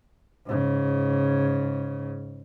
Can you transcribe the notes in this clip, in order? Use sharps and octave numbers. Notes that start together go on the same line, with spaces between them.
G#2 C#3